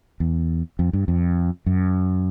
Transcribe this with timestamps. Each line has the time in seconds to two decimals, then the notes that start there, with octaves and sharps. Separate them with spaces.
0.20 E2
0.79 F2
0.93 G2
1.08 F2
1.66 F#2